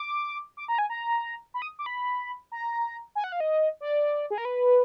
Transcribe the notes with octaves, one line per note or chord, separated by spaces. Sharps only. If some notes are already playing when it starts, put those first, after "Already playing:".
Already playing: D6
D6
A#5
G#5
A#5
B5
D#6
D6
B5
A#5
G#5
F#5
F5
D#5
D5
G#4
A#4
B4